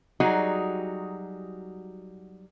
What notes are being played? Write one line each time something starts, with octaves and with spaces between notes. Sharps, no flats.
F#3 G3 D#4 F#4 G#4